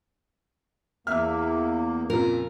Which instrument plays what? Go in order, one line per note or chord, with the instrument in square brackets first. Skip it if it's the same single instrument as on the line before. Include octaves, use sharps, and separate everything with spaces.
[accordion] E2 A#3 [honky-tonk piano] E5 F6
[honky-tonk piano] F2 A#2 C#3 [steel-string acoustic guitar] A#4